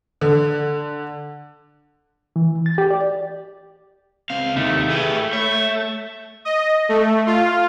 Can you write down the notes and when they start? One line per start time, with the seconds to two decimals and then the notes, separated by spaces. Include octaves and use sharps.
0.21 D3
2.36 E3
2.66 A6
2.78 G4
2.91 D5
4.30 C#2 C4 F5
4.56 D#2 C3 A3 D#4 E4 G4
4.90 E4 G4 G#4 B4
5.33 C#5 E5
6.45 D#5
6.89 A3
7.27 F4